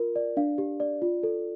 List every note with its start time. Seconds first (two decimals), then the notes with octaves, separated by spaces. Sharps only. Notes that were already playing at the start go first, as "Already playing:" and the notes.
Already playing: F4 A#4
0.16 D5
0.37 D4 F5
0.58 G4
0.80 D5
1.02 F4
1.23 A4